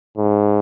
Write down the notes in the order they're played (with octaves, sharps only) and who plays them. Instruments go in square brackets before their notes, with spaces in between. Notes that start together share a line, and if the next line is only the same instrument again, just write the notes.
[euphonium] G#2